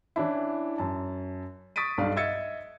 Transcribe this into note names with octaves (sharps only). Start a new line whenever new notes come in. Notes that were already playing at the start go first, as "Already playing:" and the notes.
E3 C#4 D4 E4
F#2 A5
C#6 D#6 A6 B6 D7 D#7
B1 G2 D5 F5
D#5 E5 E6 G#6 A6 C#7